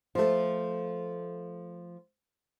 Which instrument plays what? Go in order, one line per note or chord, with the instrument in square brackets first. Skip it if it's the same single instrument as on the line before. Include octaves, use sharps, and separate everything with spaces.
[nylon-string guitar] F3 A3